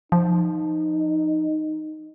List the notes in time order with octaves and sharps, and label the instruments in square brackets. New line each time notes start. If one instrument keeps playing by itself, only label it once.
[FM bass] F3 [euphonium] D#4